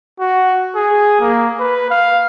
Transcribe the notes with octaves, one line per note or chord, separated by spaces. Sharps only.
F#4
G#4
A#3
B4
F5